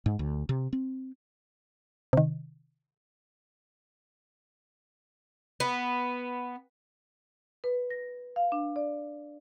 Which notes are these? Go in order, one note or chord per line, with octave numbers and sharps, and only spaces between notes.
G#2
D2
C3
C4
C3 D#3
B3
B4
A#6
F5
D4
D5